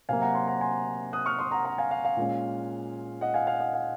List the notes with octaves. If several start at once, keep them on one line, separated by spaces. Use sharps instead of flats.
C3 F#3 A#3 F5 G#5
F#5 A#5
G#5 C6
F#5 A#5
G#5 C6
D#6 F#6
C#6 F6
C6 D#6
F#5 A#5
F#5 A#5
F5 G#5
F5
F5
A#2 G#3 C#4
D#5 F#5
F5 G#5
F5 G#5
D#5 F#5
F5